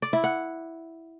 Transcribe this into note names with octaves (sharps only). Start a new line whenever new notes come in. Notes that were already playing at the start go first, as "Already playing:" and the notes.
D5
E4
F#5